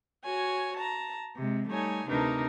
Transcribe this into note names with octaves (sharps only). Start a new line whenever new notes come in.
F#4 C#5 G#5
A5 A#5
C3 G#3
G3 A3 D#4 C#5 G#5
D2 C3 D4 D#4 A#4 B4